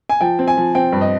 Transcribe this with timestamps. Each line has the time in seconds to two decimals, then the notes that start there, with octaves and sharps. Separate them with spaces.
0.09 G#5
0.21 F3 G5
0.39 C4
0.48 G#5
0.57 F3
0.75 C4 G5
0.93 G2
1.01 D#5